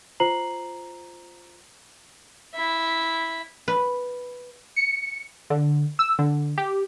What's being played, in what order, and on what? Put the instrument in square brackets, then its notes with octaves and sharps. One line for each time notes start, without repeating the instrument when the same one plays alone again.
[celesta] F4 C5 A#5 C7 F#7
[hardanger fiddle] E4 E5
[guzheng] B4
[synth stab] C#7
D3
E6
D3
G4